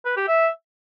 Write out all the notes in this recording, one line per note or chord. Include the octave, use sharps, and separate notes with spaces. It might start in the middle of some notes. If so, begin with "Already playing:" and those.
B4
G4
E5